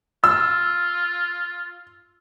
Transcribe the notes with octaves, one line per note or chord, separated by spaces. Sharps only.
F4 E6